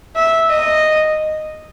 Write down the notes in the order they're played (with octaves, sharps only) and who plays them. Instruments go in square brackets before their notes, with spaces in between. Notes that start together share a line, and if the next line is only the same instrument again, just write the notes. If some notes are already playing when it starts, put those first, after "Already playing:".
[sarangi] E5
D#5